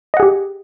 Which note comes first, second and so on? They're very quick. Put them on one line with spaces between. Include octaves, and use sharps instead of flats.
D#5 F#5 G#4 G4